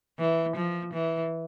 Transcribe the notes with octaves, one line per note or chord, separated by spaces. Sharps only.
E3
F3
E3